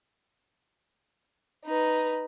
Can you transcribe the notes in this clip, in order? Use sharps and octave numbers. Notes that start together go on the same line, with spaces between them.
D#4 B4